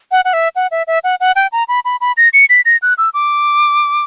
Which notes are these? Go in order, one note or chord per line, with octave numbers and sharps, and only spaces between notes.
F#5
F#5
E5
F#5
E5
E5
F#5
F#5
G5
A#5
B5
B5
B5
A#6
C#7
B6
A#6
F#6
E6
D6